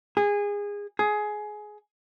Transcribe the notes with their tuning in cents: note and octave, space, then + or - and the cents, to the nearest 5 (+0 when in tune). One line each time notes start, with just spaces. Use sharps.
G#4 -20
G#4 +15